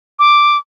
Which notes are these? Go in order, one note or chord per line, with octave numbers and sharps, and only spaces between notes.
D6